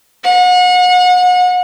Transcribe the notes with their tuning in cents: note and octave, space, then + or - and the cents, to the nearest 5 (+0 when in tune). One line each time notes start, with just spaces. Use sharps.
F#5 -35